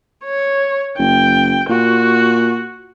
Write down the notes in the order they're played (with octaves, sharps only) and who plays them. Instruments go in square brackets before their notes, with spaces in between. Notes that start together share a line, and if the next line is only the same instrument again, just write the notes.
[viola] C#5
[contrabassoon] F#1 [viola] G5
[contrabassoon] A#2 [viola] F#4